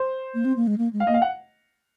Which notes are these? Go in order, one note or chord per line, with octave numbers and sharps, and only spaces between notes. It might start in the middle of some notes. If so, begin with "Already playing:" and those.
Already playing: C5
A#3
C4
A#3
G#3
A#3
G#3
F5
A#3 D#5
F5
F#5